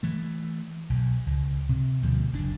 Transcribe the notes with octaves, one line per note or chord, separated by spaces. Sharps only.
E3 A3
B1
C#2
C3
D2 B2 F3 A3
F#1 D4